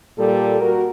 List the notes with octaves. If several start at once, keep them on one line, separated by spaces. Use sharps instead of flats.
A#2 G3 A4
F#4 A#4